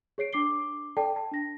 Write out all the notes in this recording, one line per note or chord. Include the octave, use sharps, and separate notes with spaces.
G#4 C#5 C7 D7
D4 D6 C7 G7
A4 D5 G5 A5
A5
D4 A#6